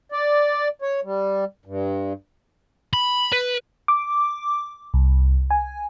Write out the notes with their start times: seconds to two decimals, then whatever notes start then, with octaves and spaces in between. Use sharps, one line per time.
0.12 D5
0.82 C#5
1.04 G3
1.65 G2
2.93 B5
3.32 B4
3.88 D6
4.94 C2
5.51 G#5